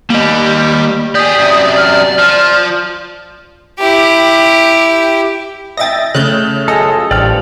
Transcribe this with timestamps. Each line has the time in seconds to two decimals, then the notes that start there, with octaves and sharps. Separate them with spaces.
0.10 G3 A#3 D#5
1.15 G4 G#4 D5 D#6
1.39 F#2 C3
1.77 F6
2.18 F3
3.78 E4 G4
5.77 D#5 E5 G5 A6 A#6
6.14 C#3 A3 F#6 G6
6.68 C#2 F#2 F4 G#4 A4 D#5
7.11 A1 G2 F3 D5 G5 F6